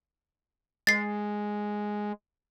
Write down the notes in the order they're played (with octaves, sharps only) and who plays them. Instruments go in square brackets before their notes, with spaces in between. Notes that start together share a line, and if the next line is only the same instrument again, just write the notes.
[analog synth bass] G#3 [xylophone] A6 C7